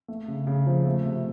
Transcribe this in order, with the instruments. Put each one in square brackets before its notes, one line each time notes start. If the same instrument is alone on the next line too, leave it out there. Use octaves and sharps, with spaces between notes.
[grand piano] A3
C#3
C#3
F3
A3
C3